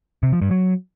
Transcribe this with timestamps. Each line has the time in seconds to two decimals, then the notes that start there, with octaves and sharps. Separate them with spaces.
0.23 C3
0.32 F3
0.42 G2
0.51 F#3